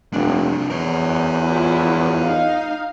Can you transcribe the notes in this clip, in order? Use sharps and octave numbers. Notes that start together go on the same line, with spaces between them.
F1 C2 D4
E2 A#4 C#5
E4 F4
D#4 F5